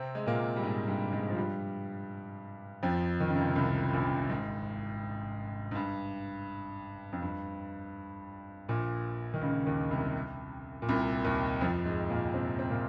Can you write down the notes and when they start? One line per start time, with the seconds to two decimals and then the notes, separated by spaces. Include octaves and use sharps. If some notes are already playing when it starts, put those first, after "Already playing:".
Already playing: C3 C4
0.15 G#3
0.26 A#2 A#3
0.56 G3
0.63 G#2 G#3
0.87 G2 G3
1.12 G#2 G#3
1.30 F3
1.37 G2 G3
2.83 F2 F3
3.20 D#3
3.27 C#3
3.35 C3
3.41 C#2 C#3
3.56 C2 C3
3.93 A#1 A#2
4.29 G#1 G#2
5.71 G#2
5.75 G2
7.12 F2
7.22 G2
8.68 A#1 A#2
9.34 D#3
9.41 C#2 C#3
9.66 D#2 D#3
9.91 C2 C3
10.82 A#2
10.89 C2 C3
11.24 D#2 D#3
11.61 F2 F3
11.85 G#2 G#3
12.10 A#2 A#3
12.34 C3 C4
12.59 C4
12.70 A#2 A#3